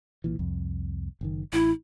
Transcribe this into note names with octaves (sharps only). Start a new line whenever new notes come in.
B1 A#2 E3
C2 F2
F#1 C3 D#3
A1 E4